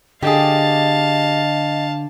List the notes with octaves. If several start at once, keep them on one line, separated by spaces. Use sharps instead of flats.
D3 G4 G#4 D#5 F5 A5